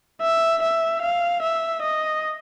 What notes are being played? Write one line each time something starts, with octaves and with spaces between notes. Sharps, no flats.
E5
E5
F5
E5
D#5